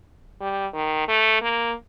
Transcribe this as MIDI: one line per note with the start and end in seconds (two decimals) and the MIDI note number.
0.41 0.67 55
0.74 1.05 51
1.08 1.41 57
1.42 1.73 58